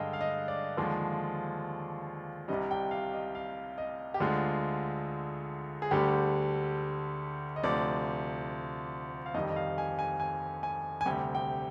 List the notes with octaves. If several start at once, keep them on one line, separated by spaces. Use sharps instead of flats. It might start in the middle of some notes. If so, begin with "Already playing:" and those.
Already playing: G2 D3 G#3 D#5 F5 G5
F5
D#5
D5
D#2 D3 F3 G#3
C2 C3 G3 D#5
G5
F5
D#5
F5
D#5
G4
D2 D3 G#3 F4
G#4
D2 D3 G3 G4
D#5
D2 C3 F3 D5
F5
F2 D#3 G3 D#5
D#5
F5
G#5
G#5
G#5
G#5
G#5
D2 C3 G3 G5
G5